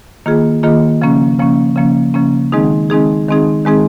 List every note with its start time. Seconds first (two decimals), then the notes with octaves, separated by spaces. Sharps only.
0.26 D#3 A#3 F4 G#4
0.63 D#3 A#3 F4 G#4
1.01 C#3 F3 A#3 C#4
1.39 C#3 F3 A#3 C#4
1.76 C#3 F3 A#3 C#4
2.14 C#3 F3 A#3 C#4
2.52 D#3 G#3 C4 D#4 G#4
2.90 D#3 G#3 C4 D#4 G#4
3.28 D#3 G#3 C4 D#4 G#4
3.65 D#3 G#3 C4 D#4 G#4